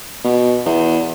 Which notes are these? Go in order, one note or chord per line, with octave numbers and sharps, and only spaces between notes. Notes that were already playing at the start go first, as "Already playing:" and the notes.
B2
E2